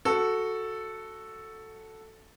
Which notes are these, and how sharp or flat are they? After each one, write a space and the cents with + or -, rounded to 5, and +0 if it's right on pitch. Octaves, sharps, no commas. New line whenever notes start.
F#4 +0 A4 +0